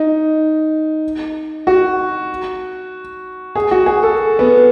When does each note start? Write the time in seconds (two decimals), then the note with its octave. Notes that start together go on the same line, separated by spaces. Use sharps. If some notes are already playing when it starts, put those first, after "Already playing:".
Already playing: D#4
1.67 F#4
3.56 G#4
3.71 F#4
3.86 G#4
4.03 A4
4.39 B3